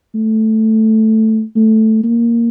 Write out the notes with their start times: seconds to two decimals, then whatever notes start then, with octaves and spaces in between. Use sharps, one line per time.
0.15 A3
1.56 A3
2.03 A#3